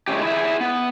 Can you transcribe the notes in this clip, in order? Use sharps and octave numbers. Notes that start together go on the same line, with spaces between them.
G#3 A3 C#4 G4
E4 G#4 E5
B3